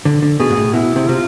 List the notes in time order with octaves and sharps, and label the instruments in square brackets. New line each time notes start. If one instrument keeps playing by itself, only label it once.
[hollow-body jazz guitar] D3
D3
[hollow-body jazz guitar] B2 [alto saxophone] G#4
[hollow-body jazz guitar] G#2
A2
[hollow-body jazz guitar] B2 [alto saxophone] E4
[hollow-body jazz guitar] C3
[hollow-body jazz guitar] C3 [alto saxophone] F4